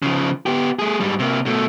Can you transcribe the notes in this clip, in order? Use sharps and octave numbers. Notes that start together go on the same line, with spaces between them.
C#3 F3
B3 G4
A3 G#4
G#2 G3
C3 A#3
B2 A3